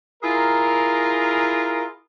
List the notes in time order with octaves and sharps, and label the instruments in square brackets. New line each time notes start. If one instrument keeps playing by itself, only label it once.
[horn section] E4 F4 G#4 A#4